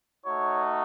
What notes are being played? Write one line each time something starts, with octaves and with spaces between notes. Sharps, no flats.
A3 D#4 F#4 C#5